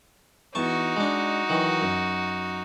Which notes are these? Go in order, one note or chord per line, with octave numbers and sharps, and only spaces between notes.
E2 D#4 F#4 A5 C#6
G#3 D4
D#3 E3 F#3
F#2